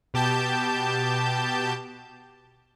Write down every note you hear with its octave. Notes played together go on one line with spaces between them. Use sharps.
B2 G4 A5 G6